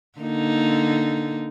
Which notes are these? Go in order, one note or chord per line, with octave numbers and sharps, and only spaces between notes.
D3 A#3 D#4